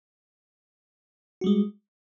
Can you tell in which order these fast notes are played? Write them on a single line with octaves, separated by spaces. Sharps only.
F#4 G3 G#3